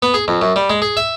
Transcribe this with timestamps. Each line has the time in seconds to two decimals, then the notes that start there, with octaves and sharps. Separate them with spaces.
0.02 B3
0.14 G#4
0.28 F2
0.42 F#2
0.56 G3
0.70 G#3
0.82 G#4
0.97 E5